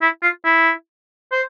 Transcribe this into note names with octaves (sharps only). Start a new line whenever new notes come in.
E4
F4
E4
C5